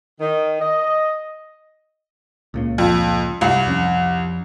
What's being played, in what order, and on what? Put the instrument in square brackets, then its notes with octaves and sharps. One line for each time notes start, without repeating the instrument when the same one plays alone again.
[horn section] D#3
D#5
[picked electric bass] C#2 A#2 C#3
[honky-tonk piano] F2
C2
[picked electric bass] F2 F3 C#4